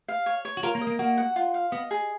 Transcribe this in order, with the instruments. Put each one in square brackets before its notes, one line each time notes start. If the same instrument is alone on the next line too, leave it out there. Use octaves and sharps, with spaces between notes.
[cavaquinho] F5
C#5
C#5
[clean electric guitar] F#4
[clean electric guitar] F4 [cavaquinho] A#4
[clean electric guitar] A#3
[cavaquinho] D#5
[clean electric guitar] A#3
[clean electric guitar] A#3 [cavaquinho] F#4
[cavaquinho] F#5
F4
F5
[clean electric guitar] B3 [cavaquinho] D#5
[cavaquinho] G#4